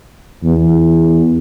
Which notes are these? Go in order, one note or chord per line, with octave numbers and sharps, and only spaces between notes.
E2